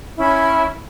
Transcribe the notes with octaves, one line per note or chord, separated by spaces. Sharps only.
C#4 E4 B5